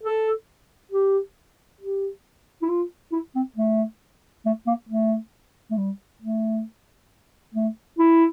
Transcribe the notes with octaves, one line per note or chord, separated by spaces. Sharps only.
A4
G4
G4
E4
F4
E4
C4
A3
A3
A#3
A3
A3
G3
A3
A3
E4